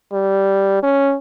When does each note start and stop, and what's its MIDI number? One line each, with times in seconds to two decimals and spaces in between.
0.13 0.82 55
0.83 1.16 61